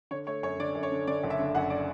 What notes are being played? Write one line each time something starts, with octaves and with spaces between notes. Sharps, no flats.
D3 C#5
A3 C#5
F#2 C#5
D3 D5
F#2
C#5
D3
D3 D5
F#1
E5
D3
F#2 F#5
D5